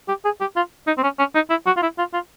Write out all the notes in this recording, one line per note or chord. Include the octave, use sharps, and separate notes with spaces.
G4
G#4
G4
F4
D#4
C4
C#4
C#4
D#4
E4
F#4
F4
E4
F4
F4